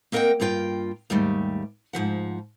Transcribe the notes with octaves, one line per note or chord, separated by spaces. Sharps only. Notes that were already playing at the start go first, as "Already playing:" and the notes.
A#3 C4 A#4 D#5 F#5 G5
G2 A#3 F4 G5
D#2 G#2 G3 A3
G#2 E3 F3 F#5